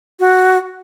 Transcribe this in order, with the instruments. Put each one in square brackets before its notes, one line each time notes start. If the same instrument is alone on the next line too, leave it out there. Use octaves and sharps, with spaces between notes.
[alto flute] F#4